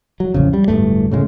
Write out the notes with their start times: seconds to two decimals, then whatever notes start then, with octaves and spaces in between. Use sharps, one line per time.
0.20 F#3
0.34 A1 F2 C#3
0.53 G3
0.68 D1 B1 G2 A3
1.11 A2 C#3 G3 G#3